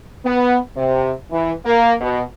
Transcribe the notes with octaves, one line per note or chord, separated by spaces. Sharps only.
B3
C3
E3
A#3
B2